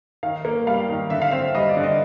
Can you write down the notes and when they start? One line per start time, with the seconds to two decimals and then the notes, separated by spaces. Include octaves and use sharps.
0.23 D#3 F5
0.45 A#3
0.67 G3 F5
0.89 D#3
1.10 D3 E5
1.22 F5
1.31 C4 E5
1.55 G3 D#5
1.69 D5
1.77 D3
1.83 D#5